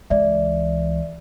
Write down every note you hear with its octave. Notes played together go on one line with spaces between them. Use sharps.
C#2 E3 D5 E5